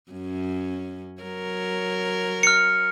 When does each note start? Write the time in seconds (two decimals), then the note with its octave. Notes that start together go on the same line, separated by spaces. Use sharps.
0.11 F#2 C#4
1.22 F#3 A#4 C#5
2.43 F6 C#7